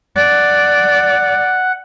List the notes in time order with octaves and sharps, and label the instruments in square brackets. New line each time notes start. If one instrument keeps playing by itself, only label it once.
[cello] D5 [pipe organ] F#5